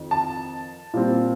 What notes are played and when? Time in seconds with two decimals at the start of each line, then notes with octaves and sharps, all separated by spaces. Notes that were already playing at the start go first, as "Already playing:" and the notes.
Already playing: F2 D#3
0.11 A5
0.93 A#2 G3 C4